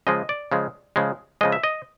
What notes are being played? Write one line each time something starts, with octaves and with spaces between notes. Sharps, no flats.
C#3 F3 G#3 D#5
D5
C#3 F3 G#3
C#3 F3 G#3
C#3 F3 G#3 D#5
E5
D#5